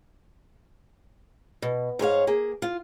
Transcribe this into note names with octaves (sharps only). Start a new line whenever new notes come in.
B2
G#2 G#4 C#5 F5
A#3 G#4
F4